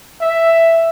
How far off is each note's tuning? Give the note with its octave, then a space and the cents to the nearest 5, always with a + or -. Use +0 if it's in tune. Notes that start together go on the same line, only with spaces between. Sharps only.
E5 +5